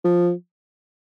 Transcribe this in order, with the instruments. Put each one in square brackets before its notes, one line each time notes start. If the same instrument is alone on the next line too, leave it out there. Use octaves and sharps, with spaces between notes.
[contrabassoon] F3